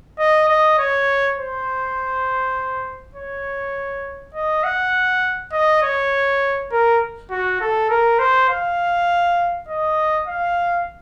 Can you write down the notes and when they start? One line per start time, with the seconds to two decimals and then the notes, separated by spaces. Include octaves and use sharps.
0.19 D#5
0.48 D#5
0.78 C#5
1.37 C5
3.15 C#5
4.34 D#5
4.64 F#5
5.52 D#5
5.83 C#5
6.72 A#4
7.30 F#4
7.61 A4
7.90 A#4
8.19 C5
8.50 F5
9.68 D#5
10.27 F5